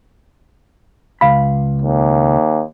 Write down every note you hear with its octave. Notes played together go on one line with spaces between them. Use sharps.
C#2 F5 B5
D#2